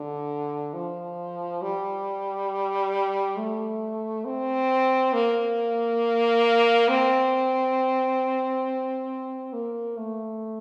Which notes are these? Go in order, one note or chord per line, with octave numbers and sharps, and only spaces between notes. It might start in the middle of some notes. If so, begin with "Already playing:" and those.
Already playing: D3
F3
G3
A3
C4
A#3
C4
A#3
A3